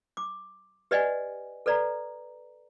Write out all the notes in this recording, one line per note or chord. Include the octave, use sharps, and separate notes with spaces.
D6
G4 B4 D5 D#5 F#5 G#5
A4 B4 D5 A#5